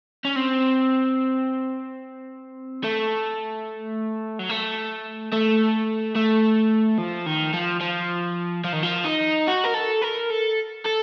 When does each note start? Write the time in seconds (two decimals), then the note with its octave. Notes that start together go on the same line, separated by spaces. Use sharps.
0.25 C#4
0.36 C4
2.84 A3
4.39 F#3
4.49 A3
5.32 A3
6.16 A3
6.98 F3
7.26 D#3
7.54 F3
7.81 F3
8.64 F3
8.73 D#3
8.83 F3
9.05 D#4
9.47 F#4
9.64 A#4
9.74 A4
10.02 A#4
10.30 A4
10.85 A4